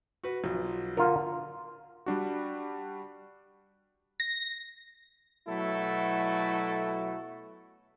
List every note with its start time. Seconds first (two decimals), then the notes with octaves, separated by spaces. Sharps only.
0.24 F#4 B4
0.44 B1 F3 F#3
0.97 D3 F4 A#4
2.06 G3 D4 F#4
4.20 A#6
5.48 B2 F#3 A3 E4 F#4 A4